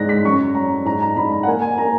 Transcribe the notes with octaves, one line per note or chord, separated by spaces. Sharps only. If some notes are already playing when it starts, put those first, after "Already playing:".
Already playing: G#2 G#3 F#6 A#6
B6
F#2 C#6
F#3 A#5
G#2 A#5
A#5
G#2 B5
A#5
F#5
A#3 G#5
G#5
A#3 A#5